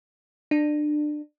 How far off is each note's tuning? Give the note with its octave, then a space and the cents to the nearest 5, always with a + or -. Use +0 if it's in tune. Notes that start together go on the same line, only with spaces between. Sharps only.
D4 +25